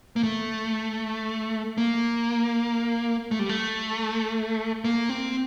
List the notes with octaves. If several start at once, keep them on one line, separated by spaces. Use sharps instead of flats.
A#3
A3
A#3
A3
G3
A3
A#3
C4